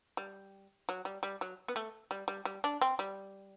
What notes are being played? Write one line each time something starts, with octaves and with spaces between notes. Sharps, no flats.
G3
F#3
G3
G3
F#3
B3
A3
G3
G3
G3
D4
C4
G3